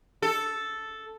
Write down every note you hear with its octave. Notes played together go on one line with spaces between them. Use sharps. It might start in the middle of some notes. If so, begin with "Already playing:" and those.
A4